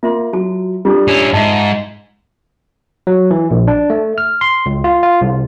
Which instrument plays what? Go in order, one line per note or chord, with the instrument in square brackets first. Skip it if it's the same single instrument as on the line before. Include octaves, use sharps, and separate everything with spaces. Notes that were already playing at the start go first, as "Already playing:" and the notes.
[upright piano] A#3 [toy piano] F4 E5 C6
[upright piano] F#3 [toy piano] F#4 A5
[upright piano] G3 D4 [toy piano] F4 A4
[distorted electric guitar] C#4 E4
[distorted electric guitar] G#2 [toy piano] D#5 E5 [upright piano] A5
[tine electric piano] F#3
E3
A#1
D4
A3
F6
C6
C#2
F4
F4
C2